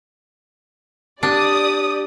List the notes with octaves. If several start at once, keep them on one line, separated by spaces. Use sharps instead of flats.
D4 G4 D5 D#6